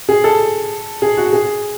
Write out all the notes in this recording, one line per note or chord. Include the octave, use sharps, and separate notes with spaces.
G#4
A4
G#4
F#4
G#4